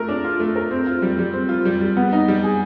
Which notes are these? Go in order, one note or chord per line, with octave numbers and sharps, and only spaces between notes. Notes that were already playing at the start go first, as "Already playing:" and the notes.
Already playing: A3 F4 A#4
D4
F4
A3
A#4
C4
F4
G3
G3
C4
F4
G3
G3
B3
D#4
G3
G#4